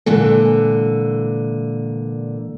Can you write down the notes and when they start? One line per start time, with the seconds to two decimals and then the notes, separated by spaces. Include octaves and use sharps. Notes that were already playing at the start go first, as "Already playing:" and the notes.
0.06 A#2 D3 E3 G#3 A#3 A4